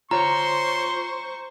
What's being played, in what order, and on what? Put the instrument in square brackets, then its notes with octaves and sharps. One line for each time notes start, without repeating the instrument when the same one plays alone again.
[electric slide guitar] F4 C#5 [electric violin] C5 C#6 [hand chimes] A#5 [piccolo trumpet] C6